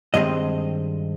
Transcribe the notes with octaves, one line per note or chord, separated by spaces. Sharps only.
G2 D#3 G#3 C4 D#5